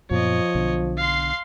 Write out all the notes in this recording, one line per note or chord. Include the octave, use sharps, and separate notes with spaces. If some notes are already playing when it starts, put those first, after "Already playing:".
F#2 A#2 F3 B3 C#5 D#5
B1 B2 D3
F5 C6